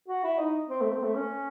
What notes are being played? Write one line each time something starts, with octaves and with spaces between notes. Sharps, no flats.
F#4
E4
D#4
C4
A3
C4
A3
C#4